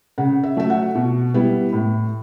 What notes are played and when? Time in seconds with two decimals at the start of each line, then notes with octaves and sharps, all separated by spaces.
0.18 C#3 F#5
0.43 E5
0.56 F#3 A3 E5
0.70 F#5
0.95 B2
1.34 G3 B3 E4
1.73 A2